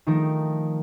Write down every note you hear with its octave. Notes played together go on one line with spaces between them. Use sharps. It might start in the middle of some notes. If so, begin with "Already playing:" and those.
D#3 F3 A3 D#4 A#4